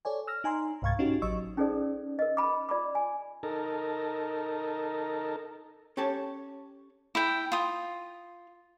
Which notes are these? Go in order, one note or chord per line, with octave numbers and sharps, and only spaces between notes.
A4 C#5 D5 G#5
E6 F6 A#6
D#4 G#5 A#5 C6
C2 G#2 F5 C#6 G#6 A6
C#4 D#4 F#4 G4
A1 F#3 D#5 C#6 E6
C#4 D#4 G#4 A4 C5 D5
A#4 D#5
B5 D6
F4 D5 B5 D6
G#5
D#4 A4 A#4
C#4 G4 A4 C#5 A5
E4 G5
F4 D#6